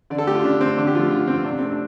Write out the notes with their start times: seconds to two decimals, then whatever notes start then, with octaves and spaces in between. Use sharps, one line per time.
0.10 D3 D5
0.18 A4
0.27 A3 G4
0.35 F4
0.44 D3 D4
0.61 A3 C4
0.78 D3 D4
0.87 G4
0.95 F3 A3 F4
1.11 D3 F4
1.27 F3 A3 C4
1.44 C3 D4
1.58 A3 C4
1.72 D4